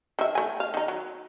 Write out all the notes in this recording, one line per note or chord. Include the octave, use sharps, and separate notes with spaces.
D#3 E5
A3 G#5
F5
D#3 D#4
F#3